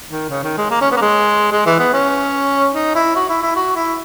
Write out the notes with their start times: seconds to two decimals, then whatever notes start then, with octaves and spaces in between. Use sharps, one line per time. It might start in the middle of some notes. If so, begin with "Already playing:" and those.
0.10 D#3
0.30 C#3
0.44 D#3
0.57 G#3
0.71 A#3
0.81 C#4
0.92 B3
0.97 A#3
1.02 G#3
1.52 G#3
1.66 E3
1.79 B3
1.93 C#4
2.74 D#4
2.95 E4
3.16 F#4
3.29 E4
3.42 E4
3.56 F#4
3.76 E4